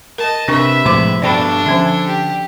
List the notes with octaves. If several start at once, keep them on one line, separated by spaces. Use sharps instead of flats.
A#4 D#5 A5
C3 D4 A#4 B4 E5 C#6
A2 C3 F3 G#3 D6
G2 B2 D4 A4 D5 G5 B5
D3 F3 C#4 E5
G4